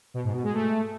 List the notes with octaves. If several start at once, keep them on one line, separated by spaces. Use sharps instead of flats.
B2
G#2
B2
G#3
A3